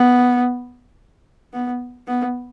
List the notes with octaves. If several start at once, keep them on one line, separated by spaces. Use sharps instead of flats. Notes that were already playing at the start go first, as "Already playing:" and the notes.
Already playing: B3
B3
B3